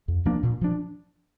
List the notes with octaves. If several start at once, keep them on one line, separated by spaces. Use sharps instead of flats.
F2
F3 A#3 D4
A#2
F3 D4